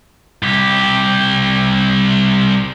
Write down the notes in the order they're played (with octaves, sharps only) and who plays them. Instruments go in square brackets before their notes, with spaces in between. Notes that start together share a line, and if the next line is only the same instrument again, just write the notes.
[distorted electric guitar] C2 G4